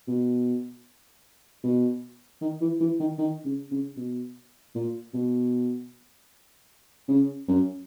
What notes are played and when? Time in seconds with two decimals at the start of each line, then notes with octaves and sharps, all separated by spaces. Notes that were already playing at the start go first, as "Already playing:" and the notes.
0.08 B2
1.64 B2
2.41 D#3
2.61 E3
2.81 E3
3.00 D#3
3.19 D#3
3.45 C#3
3.71 C#3
3.97 B2
4.75 A#2
5.14 B2
7.08 C#3
7.48 F#2